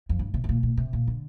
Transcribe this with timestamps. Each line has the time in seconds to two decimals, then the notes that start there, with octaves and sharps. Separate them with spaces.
0.09 F2
0.19 G2
0.34 C3
0.44 C3
0.49 A#2
0.63 A#2
0.77 C3
0.93 A#2
1.07 D3